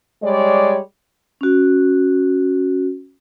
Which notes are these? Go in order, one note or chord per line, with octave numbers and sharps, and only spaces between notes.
G3 G#3 C#5 D5
C#4 F#4